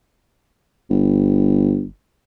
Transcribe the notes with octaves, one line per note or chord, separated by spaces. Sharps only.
G1